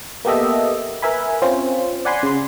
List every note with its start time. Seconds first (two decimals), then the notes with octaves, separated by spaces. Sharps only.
0.25 A#3 B3 G4 A4 D#5 E5
1.02 A#4 B4 E5 G#5 B5
1.42 C4 C#4 F4 C5
2.05 D5 F#5 G#5 B5 C6
2.23 C#3 C6